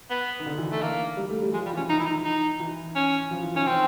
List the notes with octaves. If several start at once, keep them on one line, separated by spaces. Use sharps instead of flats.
B3
D#3
D3
E3
A3
A#3
G3
A3
G3
F3 G#3
G3
E3
C#4
D#3 D#4
E4
D#4
D#4
E3
C#4
F3
E3
D#3 C#4
D#3 C4